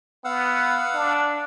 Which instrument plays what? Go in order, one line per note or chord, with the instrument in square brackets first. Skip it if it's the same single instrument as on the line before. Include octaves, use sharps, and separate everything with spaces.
[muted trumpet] B3 [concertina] F5 F#5 E6
[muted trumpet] D4